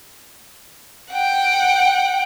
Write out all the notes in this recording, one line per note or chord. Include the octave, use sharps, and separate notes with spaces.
F#5 G5